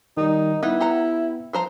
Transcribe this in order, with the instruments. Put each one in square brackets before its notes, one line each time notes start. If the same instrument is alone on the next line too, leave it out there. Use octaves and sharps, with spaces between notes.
[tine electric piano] D#3 G3 [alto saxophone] D#4
[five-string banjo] G3 D#4 B4 [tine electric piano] B3 [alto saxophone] E4
[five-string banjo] G4 F#5 A#5
F3 C5 A#5